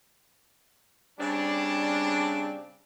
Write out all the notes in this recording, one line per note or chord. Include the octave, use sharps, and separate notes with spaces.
C#3 G3 C4 D4